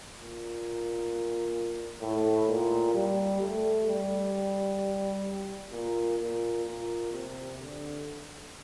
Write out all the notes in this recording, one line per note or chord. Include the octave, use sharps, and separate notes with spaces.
A#2
A2
A#2
G3
A3
G3
A#2
A#2
A#2
C3
D3